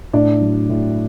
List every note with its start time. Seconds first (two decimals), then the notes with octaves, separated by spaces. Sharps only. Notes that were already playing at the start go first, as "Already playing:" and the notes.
0.13 A2 D4 D5
0.41 F#3
0.69 A2